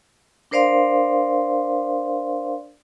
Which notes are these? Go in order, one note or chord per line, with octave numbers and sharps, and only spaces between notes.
D4 A#4 C5 D5 F5 C6